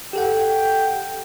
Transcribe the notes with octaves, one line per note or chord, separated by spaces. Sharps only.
G4 A4 F#5 G5